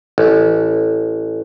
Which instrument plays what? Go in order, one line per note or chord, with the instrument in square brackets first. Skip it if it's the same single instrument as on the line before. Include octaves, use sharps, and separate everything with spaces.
[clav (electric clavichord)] A1